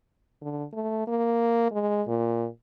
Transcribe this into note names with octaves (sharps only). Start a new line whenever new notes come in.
D3
A3
A#3
G#3
A#2